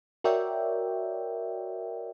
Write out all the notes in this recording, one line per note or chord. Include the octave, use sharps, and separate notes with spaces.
F#4 A#4 C#5 D5 E5 G5